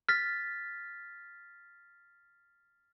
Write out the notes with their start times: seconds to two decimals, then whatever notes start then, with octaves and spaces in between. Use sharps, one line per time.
0.09 F6 A6 B6